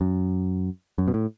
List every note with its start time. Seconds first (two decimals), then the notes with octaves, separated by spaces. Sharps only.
0.01 F#2
0.98 F#2
1.08 B2
1.14 A2